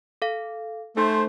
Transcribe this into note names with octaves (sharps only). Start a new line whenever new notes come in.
A4 F5
A3 D#4 C5